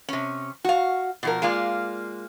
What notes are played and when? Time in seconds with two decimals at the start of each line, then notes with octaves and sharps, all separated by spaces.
0.09 C3 C#4
0.64 F#4 F5
1.23 B2 F3 A#4
1.42 G#3 A#3 F4 D5